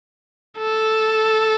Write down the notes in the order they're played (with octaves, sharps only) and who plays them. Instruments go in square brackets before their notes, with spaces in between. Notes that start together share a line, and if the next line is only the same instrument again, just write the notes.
[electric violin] A4